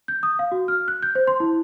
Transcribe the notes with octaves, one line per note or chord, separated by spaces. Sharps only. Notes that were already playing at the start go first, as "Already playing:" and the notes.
G6
D#6
F5
F#4
F6
F#6
G6
C5
C6
E4